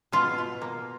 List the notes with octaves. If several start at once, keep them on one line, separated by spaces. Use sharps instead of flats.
B2 F4
B2
A#3